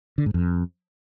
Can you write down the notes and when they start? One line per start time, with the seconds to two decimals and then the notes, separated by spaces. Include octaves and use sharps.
0.18 D3
0.26 G#2
0.34 F2